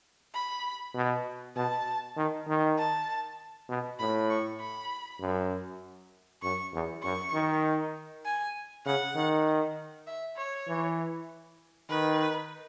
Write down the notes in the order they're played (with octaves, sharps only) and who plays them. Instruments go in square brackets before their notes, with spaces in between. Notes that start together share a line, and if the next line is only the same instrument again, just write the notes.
[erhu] B5
[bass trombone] B2
[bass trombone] B2 [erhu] A5
[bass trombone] D#3
D#3
[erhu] A5
[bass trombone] B2
[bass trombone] A2 [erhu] B5
[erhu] C#6
B5
[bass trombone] F#2
[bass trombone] F#2 [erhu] C#6
[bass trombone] E2
[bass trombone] F#2 [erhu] C#6
[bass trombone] D#3
[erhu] G#5
[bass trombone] C#3 [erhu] F#5
[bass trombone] D#3
[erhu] E5
C#5
[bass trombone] E3
[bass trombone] D#3 [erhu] B4